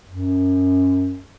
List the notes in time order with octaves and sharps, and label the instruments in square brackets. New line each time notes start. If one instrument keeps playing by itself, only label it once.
[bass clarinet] F#2